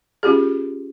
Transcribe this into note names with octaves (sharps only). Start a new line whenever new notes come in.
C#4 F4 G4 G#4